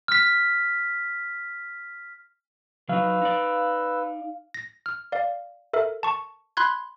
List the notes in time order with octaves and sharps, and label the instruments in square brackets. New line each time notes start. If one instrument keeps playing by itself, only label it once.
[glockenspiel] F6 B6
[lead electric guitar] F#3 D#4 [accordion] B4 E6 [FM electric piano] F5
[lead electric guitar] D#4 D5
[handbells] A#6
F6
D5 F5
A4 A#4 E5
A5 C#6
B5 C6 F#6 G#6